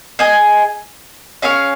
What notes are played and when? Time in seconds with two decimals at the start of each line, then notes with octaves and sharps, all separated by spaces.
0.19 G#4 D#5 G#5
1.42 C#4 G#4 C#5 F5